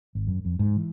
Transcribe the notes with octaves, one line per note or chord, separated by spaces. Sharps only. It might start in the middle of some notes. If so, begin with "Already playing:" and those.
G#1
F#2
F2
G#2
E3